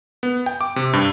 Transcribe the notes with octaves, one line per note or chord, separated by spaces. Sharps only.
B3
G5
D6
C3
G2